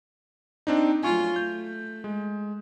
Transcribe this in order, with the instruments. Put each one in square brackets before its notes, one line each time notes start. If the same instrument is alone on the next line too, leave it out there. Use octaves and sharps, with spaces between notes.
[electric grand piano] C4 D4 D#4
[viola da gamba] F#3 A3 F4 [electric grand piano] G#5 C#6
[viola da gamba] A3 [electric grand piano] G6
[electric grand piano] G#3